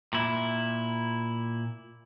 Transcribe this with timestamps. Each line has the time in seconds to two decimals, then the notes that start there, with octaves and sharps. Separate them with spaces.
0.13 A#2 E4